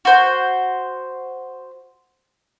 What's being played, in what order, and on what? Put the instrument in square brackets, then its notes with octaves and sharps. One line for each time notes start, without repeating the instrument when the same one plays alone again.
[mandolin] F#4 C5